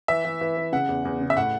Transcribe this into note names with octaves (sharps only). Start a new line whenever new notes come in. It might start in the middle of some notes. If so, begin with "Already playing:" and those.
E3 E5
E3
E3
E3
C#3 F#5
E2
E2
C#3
E5
A2 F#5